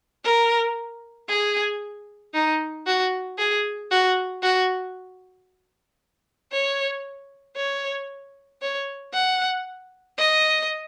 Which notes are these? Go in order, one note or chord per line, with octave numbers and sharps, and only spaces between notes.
A#4
G#4
D#4
F#4
G#4
F#4
F#4
C#5
C#5
C#5
F#5
D#5